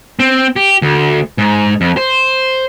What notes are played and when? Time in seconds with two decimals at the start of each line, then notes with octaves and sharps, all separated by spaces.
0.19 C4
0.56 G4
0.82 D2
1.38 G#2
1.81 F2
1.97 C5